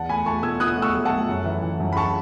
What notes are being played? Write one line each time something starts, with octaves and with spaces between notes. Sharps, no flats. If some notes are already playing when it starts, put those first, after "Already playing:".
Already playing: E2 F#5 A5
A3 G#5 B5
A3 A5 C#6
B2 E6 G#6
B2 D#6 F#6
A3
C#6 E6
F#3
F#5 A5
A3
F#2
E3
E3
F#2
B5
A5 C#6